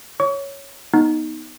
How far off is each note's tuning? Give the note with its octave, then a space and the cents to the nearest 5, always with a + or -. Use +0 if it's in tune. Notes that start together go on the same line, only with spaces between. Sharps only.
C#5 +0 C#6 +40
B3 -25 D#4 +0